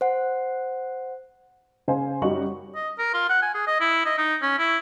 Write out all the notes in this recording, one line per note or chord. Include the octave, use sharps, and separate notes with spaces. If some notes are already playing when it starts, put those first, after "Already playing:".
C5 F#5
C#3 C5 F5 G#5
F#2 G3 D#4 F#4 C#6 F#7
D#5
A#4
F4
F#5
G#5
G#4
D#5
E4
D#5
D#4
C#4
E4